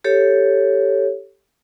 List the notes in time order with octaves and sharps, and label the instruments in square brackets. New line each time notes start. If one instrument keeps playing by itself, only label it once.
[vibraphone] G4 A4 C#5